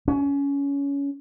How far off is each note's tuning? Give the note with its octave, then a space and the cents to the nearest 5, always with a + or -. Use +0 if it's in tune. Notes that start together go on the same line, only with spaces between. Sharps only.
C#4 +20